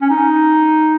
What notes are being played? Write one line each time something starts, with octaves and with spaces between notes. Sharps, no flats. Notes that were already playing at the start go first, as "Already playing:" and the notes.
C#4
D#4